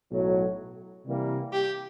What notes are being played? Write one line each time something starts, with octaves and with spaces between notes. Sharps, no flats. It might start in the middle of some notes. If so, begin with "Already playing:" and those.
B1 A2 F#3
C3 E3 G3 A#3
G4